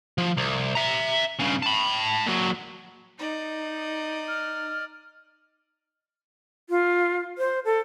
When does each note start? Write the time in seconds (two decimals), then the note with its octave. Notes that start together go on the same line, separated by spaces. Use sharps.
0.18 F3
0.37 C2
0.75 E5 A#5
1.39 G2 C#3
1.62 A5 B5
2.27 A#2 F#3
3.19 D#4 D5 D#5
4.28 F6
6.70 F4
7.38 C5
7.65 A4